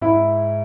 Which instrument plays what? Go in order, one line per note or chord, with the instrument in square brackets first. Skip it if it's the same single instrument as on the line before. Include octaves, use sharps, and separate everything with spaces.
[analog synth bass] G#2 [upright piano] E4